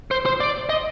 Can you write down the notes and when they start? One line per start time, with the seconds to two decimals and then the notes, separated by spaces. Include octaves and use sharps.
0.11 C5
0.26 C5
0.40 D5
0.69 D#5